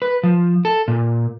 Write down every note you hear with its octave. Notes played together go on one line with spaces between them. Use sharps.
B4
F3
A4
A#2